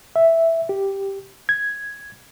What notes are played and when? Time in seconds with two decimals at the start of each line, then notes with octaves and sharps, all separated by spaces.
0.16 E5
0.69 G4
1.49 G#6